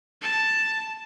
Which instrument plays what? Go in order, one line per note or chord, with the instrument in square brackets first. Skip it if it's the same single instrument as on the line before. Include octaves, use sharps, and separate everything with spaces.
[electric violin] A5